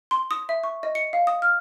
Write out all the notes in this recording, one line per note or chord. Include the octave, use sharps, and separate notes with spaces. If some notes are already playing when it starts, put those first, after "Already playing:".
C6
D#6
E5
C#6
D#5
C#7
F5
D#6
F6